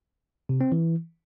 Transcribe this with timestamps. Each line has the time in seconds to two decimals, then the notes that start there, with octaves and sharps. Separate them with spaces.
0.49 C3
0.61 C4
0.72 E3